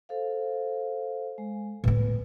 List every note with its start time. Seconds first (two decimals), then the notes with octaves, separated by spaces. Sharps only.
0.09 A4 C5 F5
1.38 G#3
1.84 A2 B3 B4